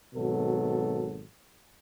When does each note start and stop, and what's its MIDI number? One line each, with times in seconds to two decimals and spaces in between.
0.15 1.25 32
0.15 1.25 47
0.15 1.25 54
0.15 1.25 69